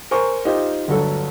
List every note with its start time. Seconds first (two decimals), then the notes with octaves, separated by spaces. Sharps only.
0.11 A#4 C5 G#5 C#6
0.45 D#4 F4 G4 C5
0.88 G1 D2 F#3 A4 C#5